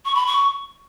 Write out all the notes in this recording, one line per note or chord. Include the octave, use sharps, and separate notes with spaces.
C#6
B5
C#6